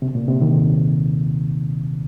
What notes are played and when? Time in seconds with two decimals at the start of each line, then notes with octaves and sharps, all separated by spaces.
0.02 C3
0.15 A#2
0.28 C3
0.41 D#2 D#3